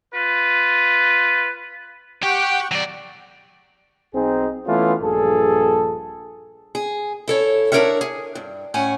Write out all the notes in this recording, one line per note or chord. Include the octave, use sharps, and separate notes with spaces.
F4 B4
G4 F#5 G5 C#6
F#3 D5
B1 C4 D#4 G#4
E3 A3 B3 C#4 F4
A#1 G2 G#4 A4
G#4
E4 A4 C#5
D4 F4 A#4 C#5 E5 F#5
G#4
G2
A2 C#4 F#5 G#5